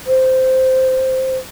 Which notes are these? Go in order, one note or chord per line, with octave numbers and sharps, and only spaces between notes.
C5